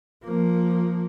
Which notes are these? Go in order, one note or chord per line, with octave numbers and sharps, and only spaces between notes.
F3 A#3